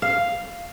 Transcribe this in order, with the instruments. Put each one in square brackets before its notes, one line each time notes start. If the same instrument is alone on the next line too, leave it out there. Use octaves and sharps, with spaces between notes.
[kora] F5